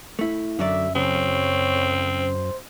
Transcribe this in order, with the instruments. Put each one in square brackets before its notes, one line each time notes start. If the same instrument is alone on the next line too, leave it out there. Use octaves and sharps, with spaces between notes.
[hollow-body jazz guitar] A3 E4
[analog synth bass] F#2 [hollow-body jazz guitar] D3 F#3 D5 [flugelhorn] E5
[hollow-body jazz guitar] C#3 [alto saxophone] C4 [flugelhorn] C#5
[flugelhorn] C5